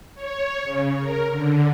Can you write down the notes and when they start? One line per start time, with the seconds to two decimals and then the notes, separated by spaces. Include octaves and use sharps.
0.15 C#5
0.64 C#3
0.99 A#4
1.30 D3